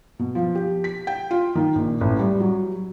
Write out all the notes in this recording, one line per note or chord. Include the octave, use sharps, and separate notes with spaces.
B2
F3
G4
B6
G5
F4
D#3
A#1
A1
G3
F#3